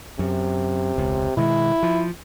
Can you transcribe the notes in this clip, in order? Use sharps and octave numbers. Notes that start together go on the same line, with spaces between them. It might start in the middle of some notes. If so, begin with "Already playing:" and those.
F#2 C3
E1 C#2
B2 D#3 G#3 E4
F3